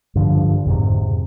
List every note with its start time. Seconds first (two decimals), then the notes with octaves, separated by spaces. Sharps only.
0.15 G2 D3 F3
0.66 F2 G#2 C3